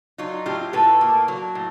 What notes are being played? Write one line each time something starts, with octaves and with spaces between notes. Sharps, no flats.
F#3 D#4 F4
A2 F4 G4
A2 A4 B4
A#3
F#3
A2